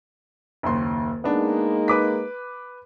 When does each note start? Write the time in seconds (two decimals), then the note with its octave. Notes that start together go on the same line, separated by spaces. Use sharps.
0.63 F#1 D#2 C6
1.24 G#3 A#3 B3 D4 D#4
1.88 B4 D6 B6